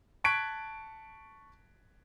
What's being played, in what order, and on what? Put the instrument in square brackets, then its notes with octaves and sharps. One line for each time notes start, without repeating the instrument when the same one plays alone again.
[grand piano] A5 C#6 F#6 G#6 B6 D7